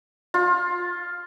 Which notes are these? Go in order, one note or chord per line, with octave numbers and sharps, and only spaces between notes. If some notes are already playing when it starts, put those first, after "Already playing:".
F4